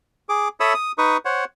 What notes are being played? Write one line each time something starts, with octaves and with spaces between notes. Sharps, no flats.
G#4 D6
A4 C#5 E5 B5 D#6 E6
D#6
D#4 B4 C#6 D#6
C5 C#5 F#5